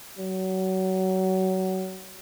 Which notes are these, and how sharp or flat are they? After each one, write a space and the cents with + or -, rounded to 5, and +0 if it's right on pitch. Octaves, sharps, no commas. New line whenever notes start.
F#3 +25